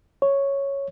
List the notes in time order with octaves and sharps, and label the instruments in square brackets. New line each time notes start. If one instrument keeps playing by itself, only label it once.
[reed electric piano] C#5